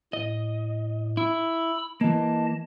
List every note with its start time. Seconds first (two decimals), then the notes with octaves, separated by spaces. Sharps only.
0.13 A2 D#5
1.17 E4 B5 E6
2.01 E3 A#3 D#5 A5